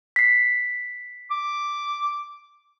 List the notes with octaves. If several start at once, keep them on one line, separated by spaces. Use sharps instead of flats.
B6 C7
D6